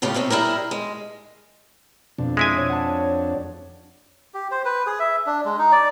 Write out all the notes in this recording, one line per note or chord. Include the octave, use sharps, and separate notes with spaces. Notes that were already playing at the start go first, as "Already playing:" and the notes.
A2 C#3 F4 G4
G#2 C3 C4 C#4
G3 E4 G#4 A#4
G#3
F2 B2 D4
G#3 E4 G#5
C#5
F#5 A5
G4
C5
B4
G#4
E5
D4
G#3
D#4
D5